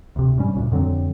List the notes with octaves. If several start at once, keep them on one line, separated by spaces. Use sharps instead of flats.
D2 C3
G#2 G3 C#4
D2 A#2
F2 D3 F#3 C4